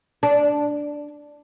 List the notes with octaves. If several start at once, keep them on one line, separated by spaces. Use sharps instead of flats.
D4